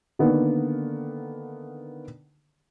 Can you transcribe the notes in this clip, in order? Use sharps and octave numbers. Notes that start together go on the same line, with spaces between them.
D3 D#3 A#3 B3